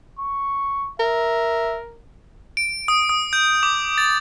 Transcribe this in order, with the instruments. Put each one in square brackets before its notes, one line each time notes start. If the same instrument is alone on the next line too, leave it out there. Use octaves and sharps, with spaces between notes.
[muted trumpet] C#6
[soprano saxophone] A#4 [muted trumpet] E5
[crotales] D7
D#6
D#6
G6
D6
A6